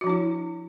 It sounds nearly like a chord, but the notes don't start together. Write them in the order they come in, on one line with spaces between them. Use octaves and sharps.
F#4 F3 D4 E4